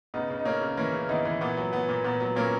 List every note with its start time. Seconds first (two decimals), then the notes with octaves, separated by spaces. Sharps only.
0.14 C#3 B3 D#4
0.30 C#3
0.40 D#4
0.45 C#3 A#3 C#4
0.61 C#3
0.77 E3 A#3 C#4
0.93 C#3
1.09 E3 B3 D#4
1.25 E3
1.41 A#2 B3
1.57 F#3
1.73 F#3 B3
1.89 A#2
2.04 A#2 B3
2.20 F#3
2.36 A#2 A#3 C#4